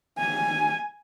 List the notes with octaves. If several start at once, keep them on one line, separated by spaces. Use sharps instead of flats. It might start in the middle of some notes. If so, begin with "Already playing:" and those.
G#5